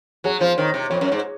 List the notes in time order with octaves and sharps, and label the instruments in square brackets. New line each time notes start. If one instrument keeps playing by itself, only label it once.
[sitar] F#3 [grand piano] G#4
[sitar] F3 [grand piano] C5
[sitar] D#3 [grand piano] C#5
[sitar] C3
[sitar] F2 [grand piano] C#5
[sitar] F#2
G#2